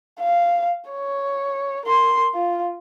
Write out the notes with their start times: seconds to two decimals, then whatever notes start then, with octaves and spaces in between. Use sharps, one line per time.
0.21 F5
0.90 C#5
1.86 A#4 C6
2.35 F4